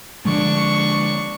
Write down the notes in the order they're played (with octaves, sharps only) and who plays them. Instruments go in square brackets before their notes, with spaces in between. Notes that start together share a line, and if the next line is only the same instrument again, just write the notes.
[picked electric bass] D3 F3 G#3 [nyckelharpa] D4 C#6